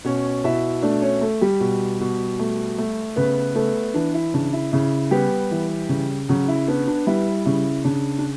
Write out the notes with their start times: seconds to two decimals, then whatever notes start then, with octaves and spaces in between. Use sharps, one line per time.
0.04 B2 C#4 C#5
0.44 B2 E4 E5
0.82 A3 D4 D5
1.02 C#4 C#5
1.21 A3 A4
1.41 G3 G4
1.60 B2
2.00 B2
2.39 A3
2.78 A3
3.16 C#3 B3 B4
3.55 A3 B3 A4
3.94 E3 D4
4.14 E4
4.34 C#3 D4
4.53 E4
4.72 C#3 E4
5.11 G3 B3 G4
5.51 E3
5.89 C#3
6.29 C#3 F#3 F#4
6.48 E4
6.68 B3 D4
6.87 D4
7.07 G3 E4
7.45 C#3 E4
7.84 C#3 D4
8.19 D4